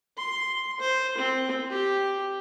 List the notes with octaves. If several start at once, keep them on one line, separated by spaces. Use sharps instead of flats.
C6
C5
C4
G4